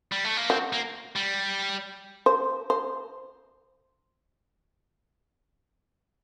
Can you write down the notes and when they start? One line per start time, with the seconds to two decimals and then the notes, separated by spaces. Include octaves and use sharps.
0.12 G3
0.25 A3
0.37 A#3
0.49 C4 F#4
0.73 A#3
1.16 G3
2.26 C5
2.70 C5